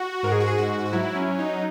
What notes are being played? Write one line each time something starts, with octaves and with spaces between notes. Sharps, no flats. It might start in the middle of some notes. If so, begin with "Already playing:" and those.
Already playing: F#4
G#2 A#4
G#4
F#4
G#4
G#2 F#4
F#4
F#3 E4
C#4
F#3
D#4